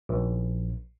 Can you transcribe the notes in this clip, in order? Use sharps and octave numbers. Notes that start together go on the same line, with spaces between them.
A#1